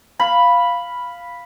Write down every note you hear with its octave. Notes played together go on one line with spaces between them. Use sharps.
F5 B5